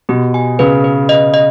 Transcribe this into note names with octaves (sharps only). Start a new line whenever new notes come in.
B2 G4
G#5
C#3 B4
B4
D#5
D#5